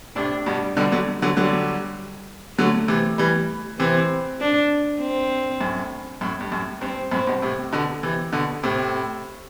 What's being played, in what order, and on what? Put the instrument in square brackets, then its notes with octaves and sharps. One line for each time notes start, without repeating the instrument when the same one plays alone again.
[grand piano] A2 C3 [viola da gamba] D4
[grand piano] G2 B2 [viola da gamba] G3
[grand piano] B2 D3 [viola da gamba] G3
[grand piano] D3 F#3
D3 F#3
[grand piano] D3 F#3 [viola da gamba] G3
[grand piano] D3 F#3 [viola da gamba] A3
[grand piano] C3 E3
E3 G3
[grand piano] C3 E3 [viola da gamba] C4
[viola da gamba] D4
C4
[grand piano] F#2 A2
F#2 A2
G2
F#2 A2
[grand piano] G2 [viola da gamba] C4
[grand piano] F#2 A2 [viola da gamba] C4
[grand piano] G2 B2
A2 C3
B2 D3
C3 E3
B2 D3
[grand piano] A2 C3 [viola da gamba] C4